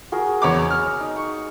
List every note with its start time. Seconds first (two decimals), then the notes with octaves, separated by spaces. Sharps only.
0.12 F#4 G#4 A#4
0.42 E2 C#5 D6
0.71 F6
1.01 D#4
1.16 C#6